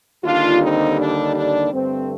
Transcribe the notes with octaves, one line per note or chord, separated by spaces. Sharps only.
D#2 D3 G3 D4 F4
C4 D#4
D4
D4
G2 D3 A3 C4